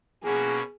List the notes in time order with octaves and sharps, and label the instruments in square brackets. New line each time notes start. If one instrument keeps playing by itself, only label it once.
[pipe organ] B2 A#3 C#4 F#4 B4 [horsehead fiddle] G#4